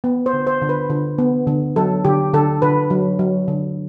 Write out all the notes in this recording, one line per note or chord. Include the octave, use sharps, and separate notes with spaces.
B3
C5
D3
C5
D3
B4
D3
B3
D3
F#3 A4
D3 G4
D3 A4
D3 B4
F#3
F#3
D3